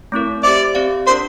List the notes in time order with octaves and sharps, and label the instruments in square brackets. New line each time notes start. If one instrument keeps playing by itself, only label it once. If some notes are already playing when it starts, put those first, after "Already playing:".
[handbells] A3 C4 E4 A#4
[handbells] G4 C5 E5 [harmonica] D5
[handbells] C4 G4 D5 F5
[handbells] D4 F4 A#4 D5 [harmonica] C5